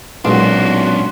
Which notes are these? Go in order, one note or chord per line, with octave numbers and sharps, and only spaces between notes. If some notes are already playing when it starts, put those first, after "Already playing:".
B1 A#2 G#3 C#4 D4 F4 F#4 C6